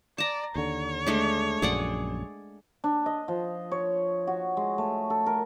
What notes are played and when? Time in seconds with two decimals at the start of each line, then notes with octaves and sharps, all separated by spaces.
0.18 D5 A5 A#5
0.55 D#2 D3 C#5
1.07 G#3 A3 D4
1.62 A#1 F#2 G#4 D5 F#5
2.84 D4
3.06 D#5
3.28 F3
3.71 C#5
4.27 F#4
4.57 G#3
4.78 A3
5.10 A4
5.26 A#4